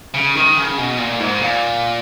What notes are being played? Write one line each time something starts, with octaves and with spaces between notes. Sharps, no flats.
C#3
D#3
C#3
B2
A#2
G#2
A#2